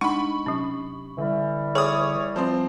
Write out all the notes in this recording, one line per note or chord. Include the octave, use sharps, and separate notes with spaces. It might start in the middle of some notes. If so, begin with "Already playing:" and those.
G#3 D4 D#4 F#5 B5 C#6
C3 F#3 C#4
D3 E3 G3
G#4 C#5 D6 D#6
F3 C4 C5